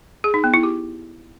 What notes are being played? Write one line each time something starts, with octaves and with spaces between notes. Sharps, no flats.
G#4
D#4
B3
E4
G4